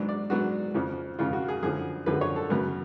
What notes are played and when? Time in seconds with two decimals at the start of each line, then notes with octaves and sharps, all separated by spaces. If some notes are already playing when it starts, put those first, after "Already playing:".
Already playing: G#2 F#3 B3 D4
0.09 D5
0.30 G#2 F#3 B3 D4 F#4
0.74 F2 C#3 F3
1.19 F2 C#3 F3 F4
1.33 F#4
1.48 G#4
1.63 F#2 D3 F3 G#4
2.06 F#2 D3 F3 B4
2.21 C#5
2.36 A4
2.50 F#2 C#3 F#3 B3